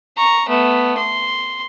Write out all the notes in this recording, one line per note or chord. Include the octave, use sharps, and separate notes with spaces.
A#5 C#6
A3 B3
C6